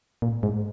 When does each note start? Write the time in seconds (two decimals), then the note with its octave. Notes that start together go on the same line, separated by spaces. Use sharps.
0.22 A#2
0.43 G#2